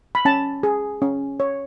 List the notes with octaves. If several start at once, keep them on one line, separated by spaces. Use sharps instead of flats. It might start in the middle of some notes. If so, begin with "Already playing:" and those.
B5
C#4 A5
G#4
C#4
C#5